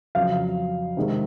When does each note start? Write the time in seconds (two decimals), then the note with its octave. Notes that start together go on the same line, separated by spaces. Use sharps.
0.15 F2 C#3 F#3 F5
0.97 C3 D#3 G#3